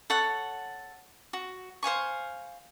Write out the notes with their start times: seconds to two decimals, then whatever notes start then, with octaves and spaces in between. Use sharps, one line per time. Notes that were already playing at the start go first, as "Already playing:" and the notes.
0.10 A4 C#5 F#5
1.33 F#4
1.83 C5 F5 G#5 C#6